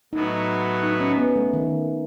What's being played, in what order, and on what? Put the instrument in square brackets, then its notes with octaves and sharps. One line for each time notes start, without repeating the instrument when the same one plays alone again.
[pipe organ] A2 F#3 B3 F#4 [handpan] D#4
[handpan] D#4
C#4
B3
A3
D#3